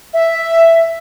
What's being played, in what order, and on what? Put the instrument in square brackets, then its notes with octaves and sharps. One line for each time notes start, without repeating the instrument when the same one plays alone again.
[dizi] E5